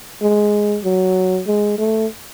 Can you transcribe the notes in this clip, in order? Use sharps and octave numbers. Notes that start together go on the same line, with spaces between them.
G#3
F#3
G#3
A3